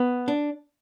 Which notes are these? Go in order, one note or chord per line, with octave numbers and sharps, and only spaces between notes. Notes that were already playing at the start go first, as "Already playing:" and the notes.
Already playing: B3
D4